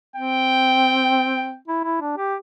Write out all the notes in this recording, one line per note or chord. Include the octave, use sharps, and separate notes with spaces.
C4 G5
E4
E4
D4
G4